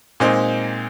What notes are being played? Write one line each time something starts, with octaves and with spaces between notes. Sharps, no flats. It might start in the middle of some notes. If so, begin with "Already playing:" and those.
A#2 G#3 C4 D#4